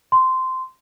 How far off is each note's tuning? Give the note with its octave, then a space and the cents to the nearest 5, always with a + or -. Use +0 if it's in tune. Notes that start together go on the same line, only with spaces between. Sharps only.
C6 -15